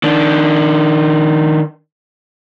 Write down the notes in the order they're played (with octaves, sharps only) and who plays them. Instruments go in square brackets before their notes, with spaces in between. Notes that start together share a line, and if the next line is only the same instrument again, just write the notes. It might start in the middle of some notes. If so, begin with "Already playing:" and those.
[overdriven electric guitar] D#3 D4